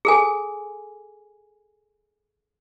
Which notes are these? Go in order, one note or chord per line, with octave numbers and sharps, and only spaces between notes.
G#4 A4 G#5